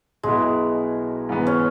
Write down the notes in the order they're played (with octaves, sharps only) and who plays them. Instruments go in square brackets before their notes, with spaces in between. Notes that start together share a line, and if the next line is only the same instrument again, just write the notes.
[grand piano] B1 B2 B3 E4 [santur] G#3
[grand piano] G#2 E3 B3
[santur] C#4